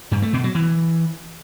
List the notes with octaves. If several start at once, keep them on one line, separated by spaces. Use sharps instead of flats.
G2
A3
B2
F#3
E3